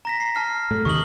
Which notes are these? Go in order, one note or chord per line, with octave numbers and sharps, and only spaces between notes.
A#5 A#6 B6
C7
A5 F6 C7
A2 A3
D#2 C3 D#3 C#6 D#6 F#7